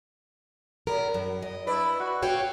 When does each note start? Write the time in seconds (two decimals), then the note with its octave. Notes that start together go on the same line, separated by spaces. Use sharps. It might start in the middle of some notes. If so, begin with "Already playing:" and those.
0.87 F#3 A#4
1.14 F#2
1.42 D#5
1.67 D4 E4 B4 D5
2.00 F#4
2.22 F#4 C#5 F5 G5